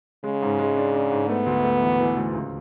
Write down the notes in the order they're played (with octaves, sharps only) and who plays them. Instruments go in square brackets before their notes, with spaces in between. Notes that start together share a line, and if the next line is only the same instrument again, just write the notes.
[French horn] C#3 [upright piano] G#3
[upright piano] G#2
G#3
D4
D4
G#2
[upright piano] A3 [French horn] B3
[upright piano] D2
A3
E3
E3
D2
C#2